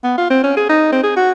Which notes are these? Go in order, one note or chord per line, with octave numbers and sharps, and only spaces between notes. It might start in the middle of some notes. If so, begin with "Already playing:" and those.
B3
F4
C4
C#4
G#4
D#4
C4
G#4
F#4